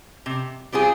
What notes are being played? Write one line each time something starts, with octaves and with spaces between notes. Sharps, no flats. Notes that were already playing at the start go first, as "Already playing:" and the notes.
C3
G3 C4 F4 G#4